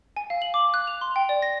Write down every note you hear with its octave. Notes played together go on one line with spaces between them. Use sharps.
G#5
F5
F#7
D6
F#6
F7
C6
G5
D5
A#6